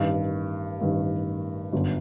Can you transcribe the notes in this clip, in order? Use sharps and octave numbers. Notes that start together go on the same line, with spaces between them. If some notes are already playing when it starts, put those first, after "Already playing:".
Already playing: A1 G2 D#3
A1 G2 D#3
G1 F#2 D3